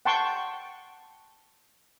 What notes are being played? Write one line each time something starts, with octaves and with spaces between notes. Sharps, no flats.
F#5 G5 A5 C6 C#6